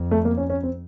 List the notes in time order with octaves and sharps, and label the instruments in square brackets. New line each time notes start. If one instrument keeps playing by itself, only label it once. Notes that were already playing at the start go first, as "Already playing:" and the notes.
Already playing: [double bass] F2
[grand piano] A3
A#3
C#4
C#4
C4